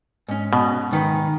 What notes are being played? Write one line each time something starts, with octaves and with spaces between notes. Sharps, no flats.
G#2 C#4
B2
G#2 D#3 B4